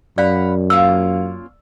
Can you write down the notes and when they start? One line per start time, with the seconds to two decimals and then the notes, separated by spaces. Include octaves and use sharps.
0.18 F#2 D5 F5 F#5 B5
0.70 A#3 C#4 F4 E6